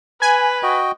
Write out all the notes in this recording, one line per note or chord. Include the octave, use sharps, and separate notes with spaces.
B4 G#5
F#4 D#5 G5